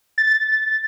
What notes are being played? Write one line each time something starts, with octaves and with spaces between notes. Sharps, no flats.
A6